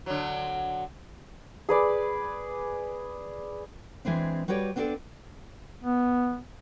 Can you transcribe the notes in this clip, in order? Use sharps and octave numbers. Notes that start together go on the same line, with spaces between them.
D3 F#3
G#4 B4 D5
E3 G#3 C4 D4
G3 F#4 B4 C#5 D5
B3 C4 D4 A4 D5
B3